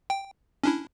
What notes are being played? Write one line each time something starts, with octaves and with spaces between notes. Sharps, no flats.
G5
C#4 D4 E4